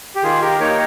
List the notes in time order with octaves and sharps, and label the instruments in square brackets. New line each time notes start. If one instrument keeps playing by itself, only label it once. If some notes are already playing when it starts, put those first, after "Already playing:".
[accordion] G4
D#3 F4 G#4
G4 A#4
A#3 D#4 A#4 C#5